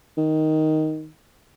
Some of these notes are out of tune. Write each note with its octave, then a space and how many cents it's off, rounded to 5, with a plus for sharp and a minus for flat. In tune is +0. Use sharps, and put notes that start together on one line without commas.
D#3 +5